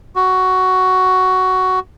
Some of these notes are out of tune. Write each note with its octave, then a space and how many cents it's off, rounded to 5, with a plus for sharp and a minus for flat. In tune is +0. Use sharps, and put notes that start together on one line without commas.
F#4 +10